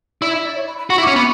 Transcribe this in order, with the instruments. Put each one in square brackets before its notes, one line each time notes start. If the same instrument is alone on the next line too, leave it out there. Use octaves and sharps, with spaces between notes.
[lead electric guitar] E4 [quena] D5
[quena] E5
D5
C#5
B5
B5
[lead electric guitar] F#4 [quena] C#6
[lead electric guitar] E4
[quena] D6
[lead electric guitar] C#4
[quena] C#6
[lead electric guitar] B3